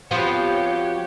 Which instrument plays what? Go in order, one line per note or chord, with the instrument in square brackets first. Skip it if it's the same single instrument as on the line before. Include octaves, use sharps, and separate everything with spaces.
[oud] F3 B3 C4 [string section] F#4 G4 C#5